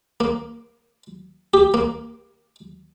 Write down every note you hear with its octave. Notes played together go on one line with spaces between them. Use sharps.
A#3
G4
A#3